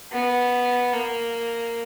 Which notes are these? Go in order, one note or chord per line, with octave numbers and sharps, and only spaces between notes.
B3
A#3